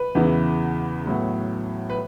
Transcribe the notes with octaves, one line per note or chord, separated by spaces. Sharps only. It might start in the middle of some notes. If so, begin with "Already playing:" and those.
Already playing: B4
E2 C#3 E3 B3
A2 F#3 B3
B4